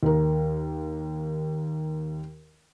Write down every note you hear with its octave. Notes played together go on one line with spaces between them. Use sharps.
D#2 A#4